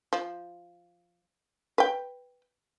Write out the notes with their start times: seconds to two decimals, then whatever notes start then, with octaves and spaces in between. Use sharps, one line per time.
0.13 F3
1.78 B4 G5